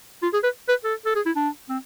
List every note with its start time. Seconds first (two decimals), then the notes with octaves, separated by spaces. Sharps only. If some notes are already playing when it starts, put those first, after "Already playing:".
0.23 F4
0.33 G#4
0.44 B4
0.69 B4
0.85 A4
1.06 A4
1.16 G#4
1.26 E4
1.36 D4
1.69 C4